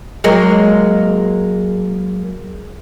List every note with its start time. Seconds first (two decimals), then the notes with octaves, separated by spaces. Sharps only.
0.24 F#3 G#3 A#3